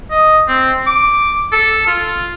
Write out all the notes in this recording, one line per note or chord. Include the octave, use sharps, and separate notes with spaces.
D#5
C4
D6
A4
F4